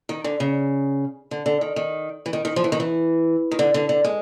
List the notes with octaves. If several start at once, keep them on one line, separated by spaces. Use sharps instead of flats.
D#3
D3
C#3
D3
D3
D#3
D#3
E3
D#3
D#3
F3
E3
D#3
E3
D#3
D3
D3
D3
G#3